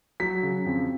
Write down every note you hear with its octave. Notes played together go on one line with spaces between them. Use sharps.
F#3 B6
C#3
F2